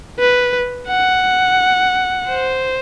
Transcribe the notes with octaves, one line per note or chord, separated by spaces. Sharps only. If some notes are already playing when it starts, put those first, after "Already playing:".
B4
F#5
C5